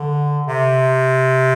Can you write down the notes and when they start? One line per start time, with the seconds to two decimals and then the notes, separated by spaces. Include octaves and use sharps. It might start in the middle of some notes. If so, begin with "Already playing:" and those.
Already playing: D3
0.47 C3